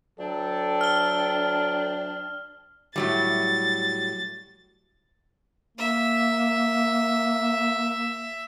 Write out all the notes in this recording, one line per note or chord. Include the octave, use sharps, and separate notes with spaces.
D2 F#3 D4 A4 G5
F6 G7
A2 F#3 G3 A6
A#3 E5